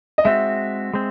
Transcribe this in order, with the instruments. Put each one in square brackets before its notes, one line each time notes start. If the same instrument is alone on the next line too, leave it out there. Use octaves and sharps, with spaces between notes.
[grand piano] D#5
[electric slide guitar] G#3 C4 F#4 [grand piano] E5
[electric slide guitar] G#3 C4